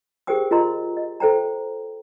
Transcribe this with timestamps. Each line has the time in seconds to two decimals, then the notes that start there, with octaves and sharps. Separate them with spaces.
0.27 G4 G#4 A#4 C5 G5 D#6
0.51 F4 A#4 D#5 A#5 C6
0.97 D#5
1.20 A4 C5 G5 A#5